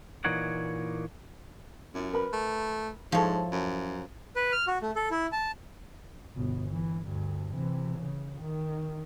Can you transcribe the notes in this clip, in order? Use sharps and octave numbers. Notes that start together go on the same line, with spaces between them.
A#2 E3 A#3 D#4 C#5 F#5
F#2 E4 F4
A#4 B4 B5
A3
G#2 F3 E4 A4 C#5
F#2
B4
F6
F#4
A3
A4
E4
A5
G1 B2
E3
D2 G2
C3 E3
C#3
D#3